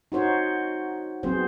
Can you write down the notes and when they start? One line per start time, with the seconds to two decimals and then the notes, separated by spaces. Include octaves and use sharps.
0.12 D#4 F#4 C5 C#5
1.23 F#3 B3 C4 G#4 C5